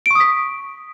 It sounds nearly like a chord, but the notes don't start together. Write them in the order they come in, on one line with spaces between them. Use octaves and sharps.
D7 C#6 D#6 B6